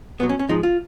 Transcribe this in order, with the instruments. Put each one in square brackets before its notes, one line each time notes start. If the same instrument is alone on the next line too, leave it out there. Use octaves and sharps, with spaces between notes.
[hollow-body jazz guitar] B1 B2 F#3 B3
C#4
C#4
G#2 F3 G#3 D#4
F4